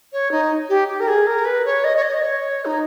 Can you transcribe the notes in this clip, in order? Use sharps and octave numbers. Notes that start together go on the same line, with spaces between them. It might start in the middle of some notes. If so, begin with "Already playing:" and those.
C#5
D#4
G4
G4
A#4
G#4
A#4
B4
C#5
D#5
C#5
D#5
C#5
D#4